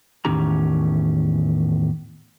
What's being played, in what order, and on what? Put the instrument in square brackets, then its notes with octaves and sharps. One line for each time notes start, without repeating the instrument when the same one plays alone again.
[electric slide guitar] E2 A2 D#3 C#4 G4 A#5